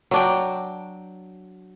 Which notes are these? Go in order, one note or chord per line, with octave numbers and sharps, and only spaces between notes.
F#3 D4 G5